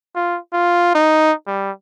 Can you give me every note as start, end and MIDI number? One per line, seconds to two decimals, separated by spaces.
0.16 0.39 65
0.53 0.93 65
0.95 1.33 63
1.47 1.71 55